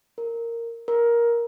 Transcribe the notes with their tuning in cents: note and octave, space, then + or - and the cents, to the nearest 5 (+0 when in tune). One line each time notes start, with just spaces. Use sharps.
A#4 -10
A#4 +15